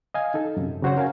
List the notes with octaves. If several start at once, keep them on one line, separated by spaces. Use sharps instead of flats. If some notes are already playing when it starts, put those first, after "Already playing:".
D#5 F5 G#5
D#4 A4
F#2 C3
C#3 F#3 F#4 C5 C#5 F#5
C#4 A#4 F5 G#5